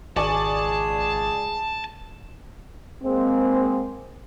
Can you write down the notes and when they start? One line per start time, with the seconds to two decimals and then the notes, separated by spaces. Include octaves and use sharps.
0.16 G#1 C#2 G#4 D5 G#5 A5 C#6
3.03 G#3 A#3 C4